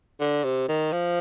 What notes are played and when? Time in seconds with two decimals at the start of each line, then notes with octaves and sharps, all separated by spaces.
0.20 D3
0.44 C3
0.68 D#3
0.92 F3